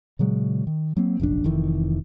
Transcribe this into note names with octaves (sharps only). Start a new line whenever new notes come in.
A#2 C#3 F#3 G#3
D#3
F#3 A#3 C4
F1 A#1 F#2 D4
F1 F2 D#3 E3